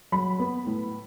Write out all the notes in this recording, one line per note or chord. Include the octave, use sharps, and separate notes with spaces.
F#3 B5
B3
A2